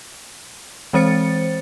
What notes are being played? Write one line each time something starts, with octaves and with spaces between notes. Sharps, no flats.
E3 G#3 C4 C5 A6 C#7